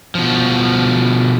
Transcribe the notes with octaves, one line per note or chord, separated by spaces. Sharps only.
B2 F3